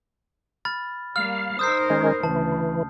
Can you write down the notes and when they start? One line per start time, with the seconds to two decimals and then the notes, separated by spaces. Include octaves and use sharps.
0.65 B5 F6 A6
1.16 G3 A#3 F5 F6
1.59 D#4 A#4 C5 D#6 E6 G6 C7
1.90 D#3 G#3 C#4
2.23 D2 C#3 E3 A5